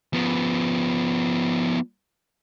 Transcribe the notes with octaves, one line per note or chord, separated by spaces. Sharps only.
F3 B3